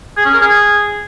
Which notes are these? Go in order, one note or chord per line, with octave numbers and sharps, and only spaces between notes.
G#4
C#4
A#4
G#4